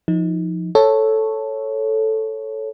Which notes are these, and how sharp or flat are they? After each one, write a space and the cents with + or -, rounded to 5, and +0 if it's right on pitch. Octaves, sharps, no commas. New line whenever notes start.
F3 +0 D#4 +20
A4 +0 C#5 -5